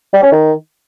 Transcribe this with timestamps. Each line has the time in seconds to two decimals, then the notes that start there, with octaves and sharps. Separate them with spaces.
0.13 G3
0.23 C#4
0.32 D#3